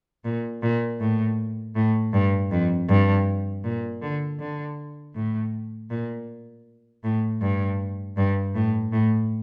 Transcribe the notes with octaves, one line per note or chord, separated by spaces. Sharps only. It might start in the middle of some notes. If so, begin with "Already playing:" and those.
A#2
A#2
A2
A2
G2
F2
G2
A#2
D3
D3
A2
A#2
A2
G2
G2
A2
A2